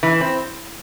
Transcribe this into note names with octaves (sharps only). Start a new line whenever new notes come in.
E3
C4